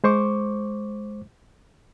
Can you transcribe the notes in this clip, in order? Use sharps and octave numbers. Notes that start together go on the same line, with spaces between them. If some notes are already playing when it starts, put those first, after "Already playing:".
G#3 C5 C#6 D6